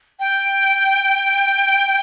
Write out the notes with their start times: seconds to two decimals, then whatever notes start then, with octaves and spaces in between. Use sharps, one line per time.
0.20 G5